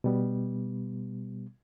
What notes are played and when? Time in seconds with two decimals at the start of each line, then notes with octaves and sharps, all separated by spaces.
0.04 B2 G3 B3